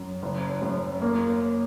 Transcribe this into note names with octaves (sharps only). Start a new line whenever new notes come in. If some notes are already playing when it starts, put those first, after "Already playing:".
Already playing: F#2
F#1
F#2
A#3